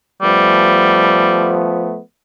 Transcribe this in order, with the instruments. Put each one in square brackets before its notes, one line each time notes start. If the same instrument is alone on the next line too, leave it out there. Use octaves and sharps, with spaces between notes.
[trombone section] F3 A3 B3 [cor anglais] G3